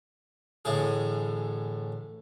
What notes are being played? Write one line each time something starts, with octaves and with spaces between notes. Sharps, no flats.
A1 A2 D3 G#4